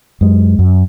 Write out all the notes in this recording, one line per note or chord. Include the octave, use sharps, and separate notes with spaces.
F#2 G#3
F#2